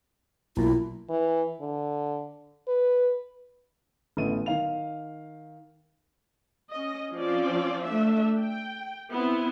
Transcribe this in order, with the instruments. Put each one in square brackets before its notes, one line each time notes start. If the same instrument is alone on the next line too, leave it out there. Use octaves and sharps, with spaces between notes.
[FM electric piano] B1 A#2 [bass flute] E4
[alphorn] E3
D3
B4
[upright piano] A1 A3 B3 D#7
D#3 F5 F7
[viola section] C#4 D#5
F3 C4 C#4 F4 D5
A3 D4 E5
G5
B3 C4 E4